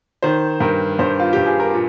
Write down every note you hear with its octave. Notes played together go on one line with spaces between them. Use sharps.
D#3 C5
G2 A#4
G2 C5
F4
G2 G4
G#4
A#4
A#2